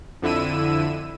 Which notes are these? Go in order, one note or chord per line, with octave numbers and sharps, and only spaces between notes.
F2 D3 E4 E6 D#7